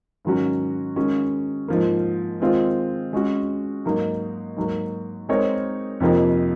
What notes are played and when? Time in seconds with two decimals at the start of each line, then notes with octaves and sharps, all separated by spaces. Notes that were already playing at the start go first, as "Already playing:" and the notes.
0.25 G#2 D#3 F#3 C#4 F#4
0.96 D#3 G#3 C#4 F#4
1.68 G#2 F3 A#3
2.40 D#3 G#3 C4 F4
3.13 G#3 C#4 F#4
3.85 G#2 F#3 A#3 D#4
4.57 G#2 F#3 A#3
5.29 G#3 C4 D#4 A#4 C#5
6.00 F2 C3 F3 A#3 D#4